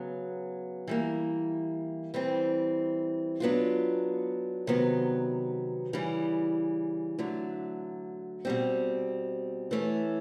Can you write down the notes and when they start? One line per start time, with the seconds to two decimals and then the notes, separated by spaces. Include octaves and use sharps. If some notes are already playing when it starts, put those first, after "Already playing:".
Already playing: C#3 F#3 B3
0.87 E3 G3 A#3
2.14 E3 G3 C4
3.40 F#3 B3 D4 F4
4.67 C3 D#3 F#3 B3
5.93 C#3 E3 G3
7.19 D3 F#3 A3
8.45 B2 G3 C4
9.71 E3 A3 C#4